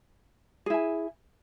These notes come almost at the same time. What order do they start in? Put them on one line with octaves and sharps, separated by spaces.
G#4 E4 G#5